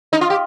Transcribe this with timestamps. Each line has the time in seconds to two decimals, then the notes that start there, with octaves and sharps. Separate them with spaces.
0.13 D#4
0.21 F4
0.30 G4